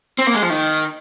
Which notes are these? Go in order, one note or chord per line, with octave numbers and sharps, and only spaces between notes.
C4
A#3
G#3
F3
D#3